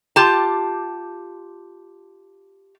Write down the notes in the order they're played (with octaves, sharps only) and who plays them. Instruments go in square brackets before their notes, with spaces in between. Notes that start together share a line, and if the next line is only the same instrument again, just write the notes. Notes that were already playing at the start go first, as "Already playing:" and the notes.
[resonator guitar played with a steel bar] F4 G4 A5